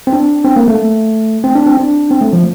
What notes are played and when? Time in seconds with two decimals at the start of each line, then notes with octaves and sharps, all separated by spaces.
0.07 C4
0.13 D4
0.45 C4
0.56 A#3
0.68 A3
1.44 C4
1.55 D4
1.66 C4
1.77 D4
2.11 C4
2.21 A3
2.33 F3